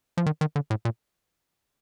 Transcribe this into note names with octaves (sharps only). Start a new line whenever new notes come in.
F3
D#3
D#3
D3
A2
A#2